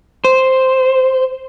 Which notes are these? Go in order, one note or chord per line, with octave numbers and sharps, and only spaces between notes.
C5